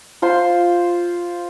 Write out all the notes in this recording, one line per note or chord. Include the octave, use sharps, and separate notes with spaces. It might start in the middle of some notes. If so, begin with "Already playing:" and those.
F4 C5 C6